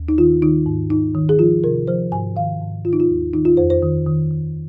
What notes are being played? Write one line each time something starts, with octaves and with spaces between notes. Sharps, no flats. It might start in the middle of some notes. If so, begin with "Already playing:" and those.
Already playing: D#2
D#4
D#3 F4
D#3 D#4
G#2
G#2 D#4
D#3
G#4
F3 F4
C3 A#4
F3 C5
G#2 G#5
D#3 F5
G#2
D#3 F4
D#4
F4
D#2
D#3 D#4
F4
F2 C5
C5
D#3
D#3
D#3